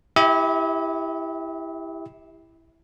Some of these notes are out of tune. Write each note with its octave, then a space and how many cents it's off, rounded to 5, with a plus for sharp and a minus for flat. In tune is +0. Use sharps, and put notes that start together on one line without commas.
E4 +0 G4 +15 E5 -40